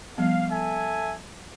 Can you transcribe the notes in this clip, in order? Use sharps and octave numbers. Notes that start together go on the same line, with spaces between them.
F3 G3 B3 F5
A4 E5 G#5